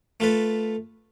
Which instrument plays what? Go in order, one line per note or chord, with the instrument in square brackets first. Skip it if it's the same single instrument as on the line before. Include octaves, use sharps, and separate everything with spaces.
[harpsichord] A3 F4 A4 B4